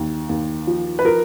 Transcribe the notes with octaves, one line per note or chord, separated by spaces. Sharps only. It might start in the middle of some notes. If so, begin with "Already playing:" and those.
Already playing: D#2
D#2
F3
B4
F3 A#4